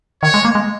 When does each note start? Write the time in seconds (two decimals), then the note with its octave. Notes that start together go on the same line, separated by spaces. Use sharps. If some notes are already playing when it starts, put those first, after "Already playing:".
0.22 D#3 C#5
0.34 G#3
0.45 A#3
0.55 G#3